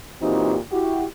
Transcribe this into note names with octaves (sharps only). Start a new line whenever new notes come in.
A#2 E3 C4 D#4 F#4 G4
E4 F#4 G4